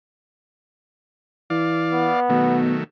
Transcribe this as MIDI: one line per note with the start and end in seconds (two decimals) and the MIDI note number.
1.50 2.09 52
1.50 2.20 74
1.50 2.20 77
1.93 2.58 59
2.29 2.75 47
2.29 2.84 51
2.29 2.84 54
2.29 2.84 57